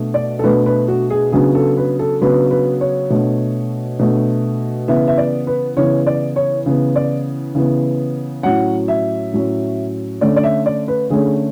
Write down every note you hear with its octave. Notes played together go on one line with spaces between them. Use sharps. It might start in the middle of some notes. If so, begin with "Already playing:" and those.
Already playing: B2 A3 D4
D5
A4
B2 A3 D4 B4
B4
F#4
G#4
C#3 F#3 B3 D4 G#4
A4
B4
A4
C#3 F#3 B3 D4 B4
B4
C#5
B2 A3 D4
B2 A3 D4
C#3 E3 B3 E5
E5
D5
B4
C#3 E3 B3 C#5
D5
C#5
C#3 E3 B3
D5
C#3 E3 B3
A2 F#3 C#4 F#5
E5
A2 F#3 C#4
D3 A3 C#4 D5
D5
E5
D5
B4
D3 A3 C#4 G#4